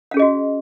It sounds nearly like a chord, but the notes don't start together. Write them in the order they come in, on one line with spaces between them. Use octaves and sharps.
F5 C#4 G#4 D#5 F#4